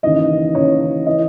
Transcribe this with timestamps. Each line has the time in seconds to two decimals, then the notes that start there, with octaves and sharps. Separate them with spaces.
0.03 D#2 C#3 E3 D#5
0.55 D#2 C#3 E3 C#5
1.06 E3 D#5